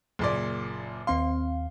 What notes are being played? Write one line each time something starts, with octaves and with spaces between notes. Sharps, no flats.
F#1 A#2 D5
D#2 C4 F5 C6